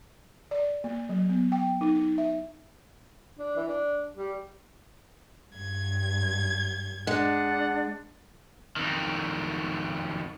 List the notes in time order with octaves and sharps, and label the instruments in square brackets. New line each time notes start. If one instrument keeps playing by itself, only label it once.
[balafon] D5
A#3
F#3
B3
G5
D#4
D#4
E5
[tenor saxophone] D4
E3
D4
G3
[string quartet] G2 G#6
[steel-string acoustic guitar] G#3 [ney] D4 [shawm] F#5
[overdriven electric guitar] F2 D#3